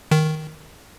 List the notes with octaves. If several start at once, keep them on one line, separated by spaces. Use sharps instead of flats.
D#3